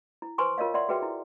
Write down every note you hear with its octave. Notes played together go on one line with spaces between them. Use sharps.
E4
B4 C5 G#5 C6 C#6
F4 A#4 C#5 D#5 F5
D5 E5 F#5 C6
F#4 G#4 B4 E5 G5
E4